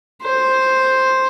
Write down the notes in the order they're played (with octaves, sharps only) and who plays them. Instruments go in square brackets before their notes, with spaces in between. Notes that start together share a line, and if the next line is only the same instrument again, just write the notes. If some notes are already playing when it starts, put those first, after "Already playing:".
[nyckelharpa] C5